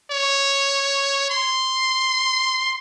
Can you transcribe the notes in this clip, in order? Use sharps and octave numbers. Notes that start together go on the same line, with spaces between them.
C#5
C6